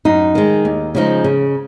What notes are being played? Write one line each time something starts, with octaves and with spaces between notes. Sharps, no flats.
F#2 D#4
D#3 G#3
D#2
C#3 F3 G#3 D#4
C#3